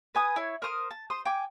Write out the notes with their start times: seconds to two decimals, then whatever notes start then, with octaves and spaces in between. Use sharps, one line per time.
0.15 B4 G#5 D#6
0.36 E4 C#5
0.62 A#4 C5 D#6 F6
0.91 A5
1.10 C5 C6 D#6
1.25 G5 G#5 D6